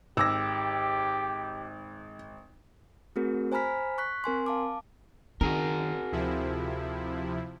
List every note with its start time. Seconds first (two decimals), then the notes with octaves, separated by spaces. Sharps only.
0.17 G#1 G4 D6 E6 A#6
3.16 A3 C4 F#4 G#4 A#4
3.52 C5 G#5 A#5 B5 F6 B6
3.98 C#6 F#6 B6
4.24 C4 A#4 G#5 C6
4.46 F5 A5 D6
5.41 D#3 C4 F#4 G#4 A#4
6.12 D2 C3 F3 E4